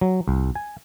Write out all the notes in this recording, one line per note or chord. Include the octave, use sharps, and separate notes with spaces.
F#3
C2
G#5